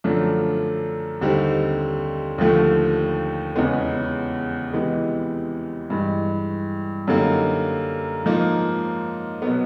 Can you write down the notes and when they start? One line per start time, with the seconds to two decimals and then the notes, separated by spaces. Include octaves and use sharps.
0.04 F#2 D3 F3 A3 D4
1.21 D#2 D3 G3 C4 D#4
2.38 D#2 D3 F3 A3
3.56 E2 C#3 E3 G#3 B3
4.74 C3 E3 G#3 B3
5.90 G2 E3 G#3
7.07 F#2 D3 G3 A#3 D#4
8.25 G#2 F3 A#3 D#4
9.42 B2 F#3 B3